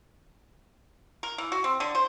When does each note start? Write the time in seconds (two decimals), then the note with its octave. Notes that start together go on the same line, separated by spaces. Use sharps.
1.23 A#4
1.38 E3
1.52 F#4
1.64 C4
1.80 D3
1.95 C5